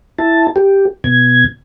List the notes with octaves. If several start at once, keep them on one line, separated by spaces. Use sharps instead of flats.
E4 A5
G4
B2 G#6